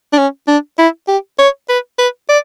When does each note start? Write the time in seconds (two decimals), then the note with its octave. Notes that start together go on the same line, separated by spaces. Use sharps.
0.13 D4
0.18 C#4
0.48 D4
0.78 E4
1.08 G4
1.39 C#5
1.69 B4
1.99 B4
2.29 D5